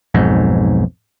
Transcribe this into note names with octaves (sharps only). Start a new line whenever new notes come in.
B1 F2 G#2